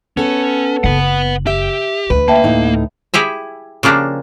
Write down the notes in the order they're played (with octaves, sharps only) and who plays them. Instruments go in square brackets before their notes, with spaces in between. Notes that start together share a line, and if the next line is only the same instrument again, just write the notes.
[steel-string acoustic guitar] B3 A4 [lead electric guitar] C#4
[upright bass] F#1 [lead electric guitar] B4 F#5
[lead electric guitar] G4 [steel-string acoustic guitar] E5
[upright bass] D2 [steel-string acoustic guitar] B4
[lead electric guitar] A#3 [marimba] E5 G5 A5
[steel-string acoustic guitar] A2 D#4
[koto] E4 G4 G#4 E5
C#3 F3 A#3 D4 G4